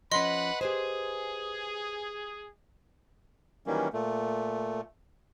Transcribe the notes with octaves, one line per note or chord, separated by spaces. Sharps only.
F3 C#4 B4 D#5 F#5 B5 C6
G4 G#4 B4 C5
D#3 E3 F#3 G3 A#3 C#4
A#2 A3